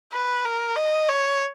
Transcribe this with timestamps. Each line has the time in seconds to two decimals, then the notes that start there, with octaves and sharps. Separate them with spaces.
0.13 B4
0.45 A#4
0.76 D#5
1.09 C#5